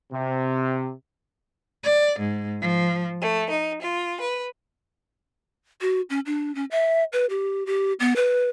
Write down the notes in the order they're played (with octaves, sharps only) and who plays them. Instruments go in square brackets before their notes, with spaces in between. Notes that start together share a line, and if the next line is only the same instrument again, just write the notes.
[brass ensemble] C3
[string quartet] D5
G#2
F3
A3
D#4
F4
B4
[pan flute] F#4
C#4
D4
C#4
E5
B4
G4
G4
B3
B4